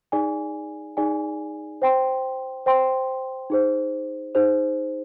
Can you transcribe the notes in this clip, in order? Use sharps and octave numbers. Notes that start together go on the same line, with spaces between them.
D#4 G#4 D5 G#5
D#4 G#4 D5 G#5
C5 G5 C6
C5 G5 C6
D#4 G#4 C5
D#4 G#4 C5